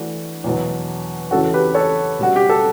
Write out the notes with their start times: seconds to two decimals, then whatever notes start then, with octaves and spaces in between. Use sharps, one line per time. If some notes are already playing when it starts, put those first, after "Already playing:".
Already playing: E3 A3 D4 F#4
0.44 E2 B2 F#3
1.31 E2 C#3 E3 A3 C#4 F#4 A4
1.53 G4 B4
1.75 A4 C#5
2.19 B2 G3 C#4 F#4
2.36 G4
2.49 A4